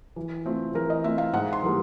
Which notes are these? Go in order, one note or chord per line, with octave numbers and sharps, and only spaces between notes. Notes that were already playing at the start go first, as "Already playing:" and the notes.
E3
A3 C4 F4
E3 A#4
D#5
A3 C4 F4 E5
F5
G#2 F#5
C6
E3 G3 A#3